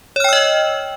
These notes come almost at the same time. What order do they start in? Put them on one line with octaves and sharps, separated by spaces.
C#5 F6 G5 E6 D#5